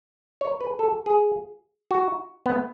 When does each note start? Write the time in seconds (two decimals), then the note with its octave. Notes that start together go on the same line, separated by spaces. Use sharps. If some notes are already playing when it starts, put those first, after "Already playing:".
0.41 C#5
0.61 B4
0.79 A4
1.06 G#4
1.91 F#4
2.46 B3